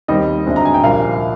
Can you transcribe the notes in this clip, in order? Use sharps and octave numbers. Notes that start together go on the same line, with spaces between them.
D#2 D#3 G3 C4 D#5
D2 D3 G#3 C4
A#5
G#5
G5
C2 A#2 F3 A#3 F5